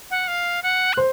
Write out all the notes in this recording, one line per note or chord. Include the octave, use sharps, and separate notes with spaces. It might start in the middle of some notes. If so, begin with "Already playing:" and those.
F#5
F5
F#5
F#6
C5